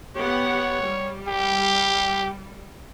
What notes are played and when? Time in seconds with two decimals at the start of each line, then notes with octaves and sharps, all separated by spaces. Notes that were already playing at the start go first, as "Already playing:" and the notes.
0.16 B3 G4 C#5 F#5
0.82 G3
1.28 G4